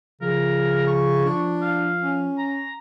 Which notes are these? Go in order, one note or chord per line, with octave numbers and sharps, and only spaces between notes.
C#3 F3 A#4
C#6
D4
F5
C#4
A#5